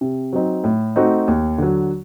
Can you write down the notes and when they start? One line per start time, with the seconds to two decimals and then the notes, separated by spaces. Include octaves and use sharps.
0.01 C3
0.33 F#3 C4 D#4
0.64 A2
0.96 A3 C4 D#4 F#4
1.28 D#2
1.58 D3 F#3